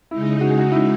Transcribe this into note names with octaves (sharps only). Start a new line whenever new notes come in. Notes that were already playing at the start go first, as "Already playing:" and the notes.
C#3 G#3 D#4 E4
F#4
G#4
F#4
E4